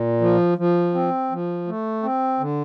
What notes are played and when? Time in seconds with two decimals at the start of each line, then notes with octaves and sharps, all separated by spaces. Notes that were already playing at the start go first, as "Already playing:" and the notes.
Already playing: A#2
0.21 F3
0.58 F3
0.94 C4
1.31 F3
1.68 A3
2.03 C4
2.40 D3